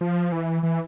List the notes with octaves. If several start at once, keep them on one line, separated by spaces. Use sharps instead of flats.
F3
E3
E3